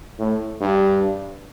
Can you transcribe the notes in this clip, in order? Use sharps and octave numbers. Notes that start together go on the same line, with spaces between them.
A2
G2